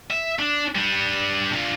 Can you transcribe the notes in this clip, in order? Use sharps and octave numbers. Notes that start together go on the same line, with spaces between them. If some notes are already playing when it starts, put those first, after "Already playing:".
E5
D4
G3 D4
D4 F4